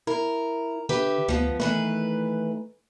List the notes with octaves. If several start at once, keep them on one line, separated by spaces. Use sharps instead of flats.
E4 A#4
D3 G4 B4 E5
D2 F3 B3
D#3 E3 A3 B4